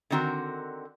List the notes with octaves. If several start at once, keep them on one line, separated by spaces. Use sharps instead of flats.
D3 D#3 C4 F#4 A#4